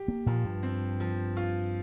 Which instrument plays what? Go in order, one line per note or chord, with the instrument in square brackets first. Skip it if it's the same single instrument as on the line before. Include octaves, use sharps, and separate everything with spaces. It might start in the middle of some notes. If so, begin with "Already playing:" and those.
Already playing: [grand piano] G4
[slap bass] A#3
[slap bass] A#2 [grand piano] F3
[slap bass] G2
[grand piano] C4
F3
F4